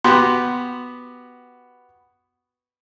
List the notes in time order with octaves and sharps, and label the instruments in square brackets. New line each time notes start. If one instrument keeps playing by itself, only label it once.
[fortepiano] B3 F#4 G4 [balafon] C6